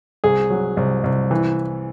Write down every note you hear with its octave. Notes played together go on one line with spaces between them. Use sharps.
C2 G#4
F#3
C2
C2
E3